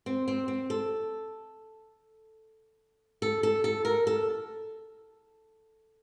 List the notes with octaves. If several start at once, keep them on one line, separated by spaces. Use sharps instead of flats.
C4
C4
C4
A4
A4
A4
A4
A#4
A4